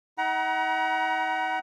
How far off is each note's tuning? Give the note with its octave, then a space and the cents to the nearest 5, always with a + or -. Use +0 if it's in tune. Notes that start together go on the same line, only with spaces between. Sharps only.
D#4 +45 F#5 +30 A#5 +30